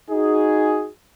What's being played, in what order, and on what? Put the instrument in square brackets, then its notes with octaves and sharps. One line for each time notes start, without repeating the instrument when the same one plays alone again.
[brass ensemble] D#4 F#4 G#4